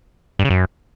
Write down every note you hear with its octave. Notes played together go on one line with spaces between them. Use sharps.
G2
C#3
F#2